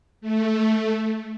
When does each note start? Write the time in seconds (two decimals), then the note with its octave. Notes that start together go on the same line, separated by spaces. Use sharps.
0.21 A3